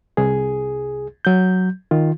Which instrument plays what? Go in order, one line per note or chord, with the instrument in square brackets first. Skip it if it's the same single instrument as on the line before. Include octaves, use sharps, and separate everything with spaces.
[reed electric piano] C2 G#4
F#3 G6
D#3 F4